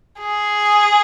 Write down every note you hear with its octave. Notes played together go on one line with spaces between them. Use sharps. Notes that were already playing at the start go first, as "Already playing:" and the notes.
G#4